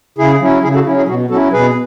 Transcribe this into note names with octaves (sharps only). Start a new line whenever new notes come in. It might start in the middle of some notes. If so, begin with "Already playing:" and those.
C#3 E4 G#4
F#3 C#4 E4
C#3 E4 G#4
F#4 A4
F#3 C#4 E4
E4 G#4
B2 F#4
F#3 C#4 E4 F#4 A4
B2 G#4 B4